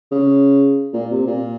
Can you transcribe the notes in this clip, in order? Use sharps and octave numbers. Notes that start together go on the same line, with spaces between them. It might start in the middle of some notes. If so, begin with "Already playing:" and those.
C#3
A#2
C3
A#2